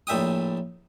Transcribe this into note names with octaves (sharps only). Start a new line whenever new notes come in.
A#1 A2 E5 G5 D#6